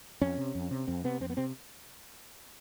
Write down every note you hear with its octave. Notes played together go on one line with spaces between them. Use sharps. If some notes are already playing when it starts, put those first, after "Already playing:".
F2 C#4
C3
F2
C3
F2 C4
C3 B3
F2 C4
B3
C3 C4